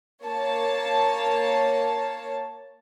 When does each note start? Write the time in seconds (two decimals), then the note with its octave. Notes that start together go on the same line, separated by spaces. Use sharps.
0.23 A#3 C#5 A5